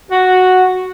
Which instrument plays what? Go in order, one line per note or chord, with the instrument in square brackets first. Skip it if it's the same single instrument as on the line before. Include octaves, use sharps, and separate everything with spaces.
[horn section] F#4